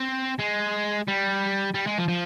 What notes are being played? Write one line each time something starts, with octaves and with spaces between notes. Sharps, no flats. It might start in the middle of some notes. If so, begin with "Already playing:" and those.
Already playing: C4
G#3
G3
G3
G#3
F3
F3